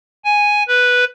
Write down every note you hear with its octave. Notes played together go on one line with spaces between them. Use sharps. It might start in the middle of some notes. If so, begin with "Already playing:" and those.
G#5
B4